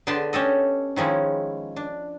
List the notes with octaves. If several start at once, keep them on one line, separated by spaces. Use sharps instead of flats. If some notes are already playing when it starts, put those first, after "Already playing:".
D3 B3 B4 G5 A5 C6
C#4 G4 A4 D#5
D#3 F3 G#3 C#4 E4
D4